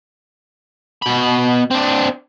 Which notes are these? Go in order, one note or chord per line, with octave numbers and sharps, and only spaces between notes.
B2 B5
C4 D4